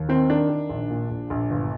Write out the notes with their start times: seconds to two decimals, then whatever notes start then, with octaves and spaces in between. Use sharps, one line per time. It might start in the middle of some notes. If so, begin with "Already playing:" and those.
Already playing: D#2
0.09 D#3 C4
0.30 D#3 D4
0.49 D#3
0.69 A#1
0.90 A#2
1.10 A#1
1.30 A#1
1.50 G1